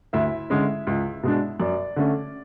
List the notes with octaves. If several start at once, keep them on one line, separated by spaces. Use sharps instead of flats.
D2 E4 E5
D3 G#3 C#4
C#2
B2 G#3 D4
F#2 D5
D3 A3 C#4